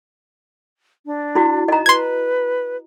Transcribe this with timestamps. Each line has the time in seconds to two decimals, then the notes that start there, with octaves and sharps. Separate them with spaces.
1.06 D4
1.35 E4 F#4
1.68 D#4 D#5 A#5
1.86 B4 C6 G#6